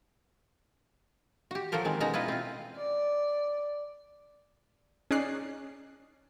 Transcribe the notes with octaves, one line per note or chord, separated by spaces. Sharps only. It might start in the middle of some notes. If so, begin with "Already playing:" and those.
F#4 G4
F3 F#3 A4 A#4 C5
D#3 G#3 C4
B2 G#3 C#4 D#4 F#4 A#5
E4 F4 B4 D#5
C4 F4
D5
C#4 D#4 G#4 D5 F#6 C7